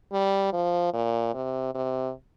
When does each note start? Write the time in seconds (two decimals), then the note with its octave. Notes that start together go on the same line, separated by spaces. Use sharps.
0.13 G3
0.53 F3
0.94 A#2
1.34 C3
1.75 C3